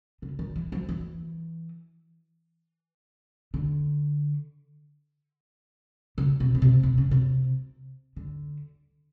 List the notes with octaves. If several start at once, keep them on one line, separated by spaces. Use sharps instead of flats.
C#3
D#3
E3
F3
E3
D3
C#3
C3
C#3
C3
C3
C#3
C3
D3